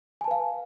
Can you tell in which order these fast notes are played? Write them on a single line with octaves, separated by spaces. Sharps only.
G#5 A5 B4 F5